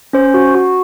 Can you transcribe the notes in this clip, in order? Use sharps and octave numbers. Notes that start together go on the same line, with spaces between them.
C#4 C5
F#4
F#4